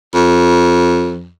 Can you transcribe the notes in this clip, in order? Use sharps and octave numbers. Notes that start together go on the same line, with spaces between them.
F2